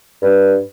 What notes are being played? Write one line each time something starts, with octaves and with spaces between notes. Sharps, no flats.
G2